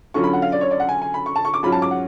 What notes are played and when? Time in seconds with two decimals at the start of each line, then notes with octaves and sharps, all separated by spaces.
0.14 D3 F#3 C#4 F4 C#6
0.24 B5
0.33 F#5
0.42 F5
0.52 D5
0.61 C#5
0.71 D5
0.80 F#5
0.89 G#5
1.02 G#5
1.14 B5
1.26 C#6
1.36 A5
1.45 C#6
1.54 D6
1.63 G#2 F#3 C#4 F4 B5
1.72 A5
1.82 D6
1.91 F#5